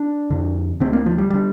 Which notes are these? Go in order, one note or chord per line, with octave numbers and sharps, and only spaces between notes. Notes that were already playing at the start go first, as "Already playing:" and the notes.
Already playing: D4
F2 D3
D2 D3 C4
A#3
F3
G3
D3 G3